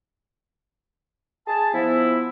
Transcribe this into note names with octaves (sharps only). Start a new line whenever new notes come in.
G#4 A5
F3 B3 E4